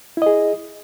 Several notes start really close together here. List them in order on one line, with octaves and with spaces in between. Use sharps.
E4 D#5 G#4